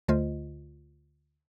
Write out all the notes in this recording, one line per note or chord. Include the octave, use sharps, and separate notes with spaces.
D2 D3 A3 F4 C5 D#5